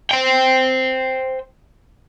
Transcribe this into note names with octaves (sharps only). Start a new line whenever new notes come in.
C5 G5